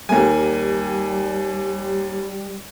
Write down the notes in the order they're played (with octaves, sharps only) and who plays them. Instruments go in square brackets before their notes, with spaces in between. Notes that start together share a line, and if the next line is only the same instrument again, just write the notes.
[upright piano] D#2 A#3 G#5 [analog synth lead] G3